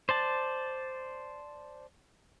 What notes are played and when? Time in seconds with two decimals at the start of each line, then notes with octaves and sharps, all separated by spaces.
0.09 C5 D5 A5